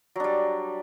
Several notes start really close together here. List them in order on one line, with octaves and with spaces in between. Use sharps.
F#3 D4 G3